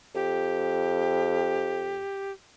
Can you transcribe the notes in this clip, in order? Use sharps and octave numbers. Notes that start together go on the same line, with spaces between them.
F2 G4